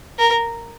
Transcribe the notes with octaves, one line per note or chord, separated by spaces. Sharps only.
A#4